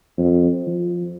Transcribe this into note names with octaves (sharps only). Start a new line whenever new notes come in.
F2
F3